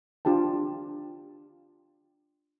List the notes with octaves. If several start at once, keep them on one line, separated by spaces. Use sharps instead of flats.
D4 F4 G4 G5 A5